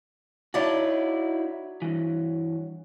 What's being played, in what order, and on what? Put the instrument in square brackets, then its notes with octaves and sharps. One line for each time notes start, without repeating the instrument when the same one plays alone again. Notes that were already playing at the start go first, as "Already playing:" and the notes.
[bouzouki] F#3 D5 A5 [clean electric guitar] D#4 E4 F#4
[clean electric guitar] G2 E3